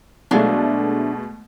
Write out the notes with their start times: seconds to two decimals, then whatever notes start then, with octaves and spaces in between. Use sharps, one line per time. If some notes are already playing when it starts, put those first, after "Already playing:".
0.31 B2 F#3 G#3 A3 D4 F5